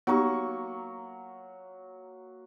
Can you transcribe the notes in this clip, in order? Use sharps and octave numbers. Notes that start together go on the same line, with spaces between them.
F#3 A#3 B3 D#4 G4 C#6